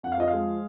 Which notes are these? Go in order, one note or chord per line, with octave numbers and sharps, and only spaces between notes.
F2 F#5
F5
F3 D#5
F5
G#3